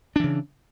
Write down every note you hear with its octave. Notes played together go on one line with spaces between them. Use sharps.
C#3 E3 D4